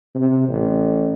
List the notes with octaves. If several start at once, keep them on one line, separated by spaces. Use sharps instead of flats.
C3
A1